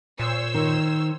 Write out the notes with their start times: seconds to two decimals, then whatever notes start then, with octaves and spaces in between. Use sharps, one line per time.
0.20 A#2 C5 C#5 E6
0.54 D#3